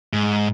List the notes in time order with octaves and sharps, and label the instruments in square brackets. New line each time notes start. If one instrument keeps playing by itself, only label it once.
[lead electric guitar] G#2